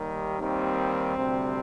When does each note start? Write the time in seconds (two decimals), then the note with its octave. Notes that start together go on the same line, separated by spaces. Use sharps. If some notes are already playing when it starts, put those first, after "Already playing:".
Already playing: D#2 D#3 G3
0.39 D#2 D#3 G3 C4
1.16 D2 C3 G3